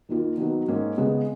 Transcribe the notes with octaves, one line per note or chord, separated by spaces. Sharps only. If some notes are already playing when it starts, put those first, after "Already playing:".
D#2 D#3 A#3 F4
D#3 F#3 B3
G#2 D#3 A#3 C#4
C#3 G#3 B3